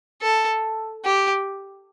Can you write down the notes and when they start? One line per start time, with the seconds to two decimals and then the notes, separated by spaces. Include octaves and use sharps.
0.23 A4
1.05 G4